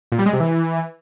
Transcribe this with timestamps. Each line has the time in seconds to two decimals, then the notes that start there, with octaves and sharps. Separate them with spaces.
0.12 A#2
0.19 G3
0.26 G#3
0.33 C3
0.40 E3